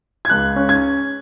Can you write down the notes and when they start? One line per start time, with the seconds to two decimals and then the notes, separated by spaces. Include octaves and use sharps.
0.25 G#6
0.30 C#2 F#6
0.56 C#4
0.69 G#6